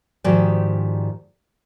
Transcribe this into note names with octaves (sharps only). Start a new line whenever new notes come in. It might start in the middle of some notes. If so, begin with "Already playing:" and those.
G#2 D#3 F3 F#4 G4 D5